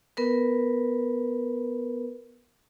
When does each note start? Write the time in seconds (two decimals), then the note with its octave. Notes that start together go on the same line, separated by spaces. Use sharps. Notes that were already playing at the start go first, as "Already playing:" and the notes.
0.17 B3 A#4 B4